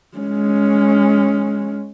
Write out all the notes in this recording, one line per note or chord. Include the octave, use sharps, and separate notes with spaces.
G#3 C#4